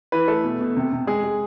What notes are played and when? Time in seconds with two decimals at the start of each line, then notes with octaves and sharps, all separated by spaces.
0.12 E3 B4
0.28 A3 A4
0.44 B2
0.61 B2
0.77 C3
0.93 C3
1.07 G#3 G#4
1.24 G#3